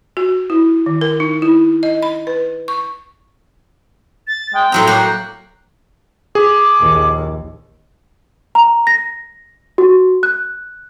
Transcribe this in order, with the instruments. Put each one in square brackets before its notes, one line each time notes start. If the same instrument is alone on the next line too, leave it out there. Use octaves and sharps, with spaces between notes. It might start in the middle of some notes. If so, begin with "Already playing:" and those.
[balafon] F#4
E4
D#3
A#4
D#4
E4
D#5
B5
B4
C#6
[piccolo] A6
[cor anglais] G#3 [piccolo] G5
[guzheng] A2 F#3 A#5 [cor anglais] C4 [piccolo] G5
[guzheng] A#3 F#4 [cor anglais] G5 [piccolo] F#6
[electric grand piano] G#4 [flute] D6
[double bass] A#1 D#2
[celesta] A#5
A#6
F#4
F#6